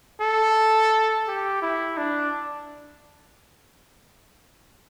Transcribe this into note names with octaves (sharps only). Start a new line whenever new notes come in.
A4
G4
E4
D4